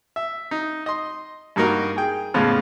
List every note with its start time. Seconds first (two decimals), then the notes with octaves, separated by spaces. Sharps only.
0.16 E5
0.51 D#4
0.86 D#5 C6
1.56 G2 A#3 D#4 F#4 A#4 D#5
1.96 G#4 G5
2.34 F2 A2 C#3 B3 F4